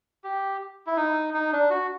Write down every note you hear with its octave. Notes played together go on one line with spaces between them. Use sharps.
G4
E4
D#4
D#4
D4
F#4